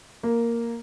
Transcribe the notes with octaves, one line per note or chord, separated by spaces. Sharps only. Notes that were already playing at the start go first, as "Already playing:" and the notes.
A#3